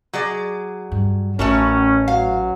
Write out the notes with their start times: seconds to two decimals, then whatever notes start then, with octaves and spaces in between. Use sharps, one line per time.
0.13 F#3 G#4 D5
0.92 G2
1.39 A1 A2 A3 C#4 F#4 A#4
2.08 F#3 F5